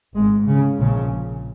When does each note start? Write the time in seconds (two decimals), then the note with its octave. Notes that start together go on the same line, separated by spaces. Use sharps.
0.14 G#1 G#2 G#3
0.46 C#3
0.78 A#1 A#2 C#3